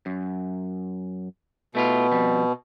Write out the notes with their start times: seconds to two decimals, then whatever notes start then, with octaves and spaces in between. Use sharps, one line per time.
0.06 F#2
1.75 B2 A3 E4 F4
2.12 F2 G3